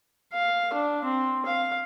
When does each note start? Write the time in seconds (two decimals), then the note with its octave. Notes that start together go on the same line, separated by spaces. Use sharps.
0.33 F5
0.73 D4
1.05 C4
1.46 F5